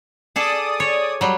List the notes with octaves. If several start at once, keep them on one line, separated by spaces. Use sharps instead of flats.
G#4 A4 D5 A5 D#6
C#5
F#3 G3